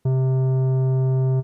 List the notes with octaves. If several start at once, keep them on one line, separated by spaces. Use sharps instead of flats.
C3